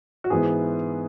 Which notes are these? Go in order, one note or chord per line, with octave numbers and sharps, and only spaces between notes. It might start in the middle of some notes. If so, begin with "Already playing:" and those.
F#4
G#2 E3 B3 E4 G#4